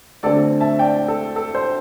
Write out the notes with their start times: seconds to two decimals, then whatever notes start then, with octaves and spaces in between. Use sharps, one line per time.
0.23 D2 D3 A3 C4 A4 D5
0.61 E5 A5
0.79 D5 G5
1.08 A4
1.36 A4
1.55 C5